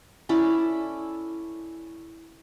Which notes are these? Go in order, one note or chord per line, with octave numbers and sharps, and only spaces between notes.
C#4 E4 A4 D5